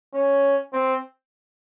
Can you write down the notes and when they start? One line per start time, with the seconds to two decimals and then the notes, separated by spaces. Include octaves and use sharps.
0.14 C#4
0.73 C4